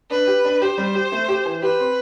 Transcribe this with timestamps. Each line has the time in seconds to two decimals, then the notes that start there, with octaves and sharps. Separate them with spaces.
0.11 D4 B4
0.27 G4
0.45 D4
0.62 G4 C5
0.78 G3
0.95 G4
1.12 A3
1.28 G4
1.45 E3
1.62 G4 B4
1.79 C4